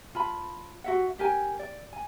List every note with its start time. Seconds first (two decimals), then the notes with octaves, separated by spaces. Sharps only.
0.15 F4 A5 B5
0.84 F#4 E5 F#5
1.18 D4 G4 A#4 G#5
1.59 D5
1.93 G#5